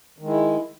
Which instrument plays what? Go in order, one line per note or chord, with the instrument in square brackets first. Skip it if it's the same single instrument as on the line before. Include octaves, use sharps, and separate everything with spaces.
[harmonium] D#3
G#3
E4